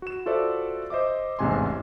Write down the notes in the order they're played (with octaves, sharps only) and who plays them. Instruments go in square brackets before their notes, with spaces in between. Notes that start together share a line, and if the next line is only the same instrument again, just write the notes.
[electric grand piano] F#4 E7
F4 F#4 A4 C5 D5 E5
C5 D#5 E5 D6
A1 E2 G#2 C3 G#5 C6